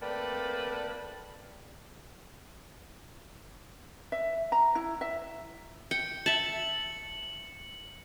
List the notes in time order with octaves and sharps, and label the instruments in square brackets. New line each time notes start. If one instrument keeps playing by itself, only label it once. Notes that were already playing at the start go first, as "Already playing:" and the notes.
[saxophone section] A3 A#3 C4 B4 D5
[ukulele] E5
A#5
E4
E5
[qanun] G5 [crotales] C#7
[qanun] E5 A5 [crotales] F#7